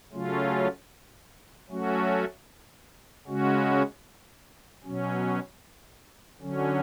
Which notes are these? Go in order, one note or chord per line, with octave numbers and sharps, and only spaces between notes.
C#3 F#3 A3 C#4 F4
F#3 A3 C#4 F#4
C#3 G#3 C#4 F#4
B2 F#3 C#4
D3 F#3 C#4